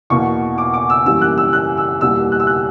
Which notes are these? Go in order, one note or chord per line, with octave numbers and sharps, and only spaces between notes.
E2 B2 A#3 C#6
D6
D6
E6
F#2 E3 G3 A#3 E6
F#6
E6
F#6
E6
E2 B2 G3 A#3 E6
F#6
E6
F#6